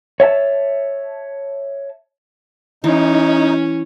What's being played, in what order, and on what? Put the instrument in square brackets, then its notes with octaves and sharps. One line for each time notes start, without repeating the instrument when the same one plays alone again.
[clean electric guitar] C#5 E5 F#5 A5
[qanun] E3 [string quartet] C#4 [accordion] D#4